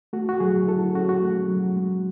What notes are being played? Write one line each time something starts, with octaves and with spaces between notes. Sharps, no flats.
A3 F#4
F#4
F#3 G#4
E4 A4
C#4 F#4
F#4
A3
F#3
G#3